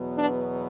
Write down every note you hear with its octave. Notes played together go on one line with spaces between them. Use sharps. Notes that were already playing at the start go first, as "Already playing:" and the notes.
Already playing: E2 B2 F#3 B3
D4